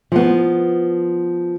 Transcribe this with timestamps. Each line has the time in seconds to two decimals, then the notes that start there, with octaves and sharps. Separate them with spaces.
0.12 F3 B3